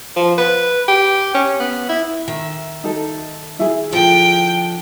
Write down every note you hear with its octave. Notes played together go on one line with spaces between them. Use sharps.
F3
B4
G4
C#4
B3
E4
D#3 E5
D#4 A4
E4 G#4
D3 F3 G5